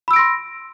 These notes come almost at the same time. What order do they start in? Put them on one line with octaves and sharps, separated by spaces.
B5 E6 D7 A#6 C6